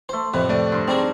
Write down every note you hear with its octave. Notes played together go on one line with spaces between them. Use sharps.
A3 C5 C6
F2 A2 C3 B4
A3 D5
G2 C5
C4 D4 D#4 G#4 G5